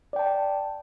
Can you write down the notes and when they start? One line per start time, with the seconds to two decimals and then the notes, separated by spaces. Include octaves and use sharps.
0.13 D5
0.16 G5
0.19 A5